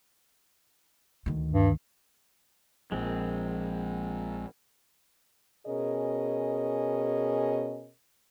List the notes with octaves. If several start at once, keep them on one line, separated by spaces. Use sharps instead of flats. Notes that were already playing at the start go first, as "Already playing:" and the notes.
D2 D#3
G2
A#1 F3 G#3 C4
B2 C#4 G#4 A#4 D#5